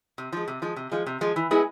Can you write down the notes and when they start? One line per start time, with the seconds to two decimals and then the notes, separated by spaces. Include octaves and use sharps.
0.18 C3
0.33 F3 G#3
0.48 C3
0.62 F3 G#3
0.76 C3
0.92 F3 G#3
1.06 C3
1.21 F3 G#3
1.36 E3
1.51 G#3 B3 E4 G#4